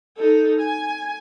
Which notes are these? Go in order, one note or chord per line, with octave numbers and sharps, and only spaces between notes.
D#4 A4
G#5